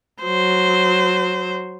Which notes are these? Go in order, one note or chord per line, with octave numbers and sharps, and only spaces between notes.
F#3 C5